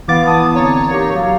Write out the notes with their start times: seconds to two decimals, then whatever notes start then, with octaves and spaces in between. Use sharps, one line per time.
0.08 E3 B3 E4 F5 D6 A6
0.26 A5 D#6
0.54 D3 C4 C#5 A#5
0.90 A#3 D#4 G4
1.14 F#3 F5